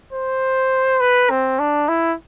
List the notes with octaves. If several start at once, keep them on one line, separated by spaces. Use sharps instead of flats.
C5
B4
C4
D4
E4